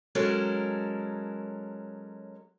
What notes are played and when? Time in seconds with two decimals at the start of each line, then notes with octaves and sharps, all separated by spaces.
0.15 F#3 G#3 C#4 A4 A#4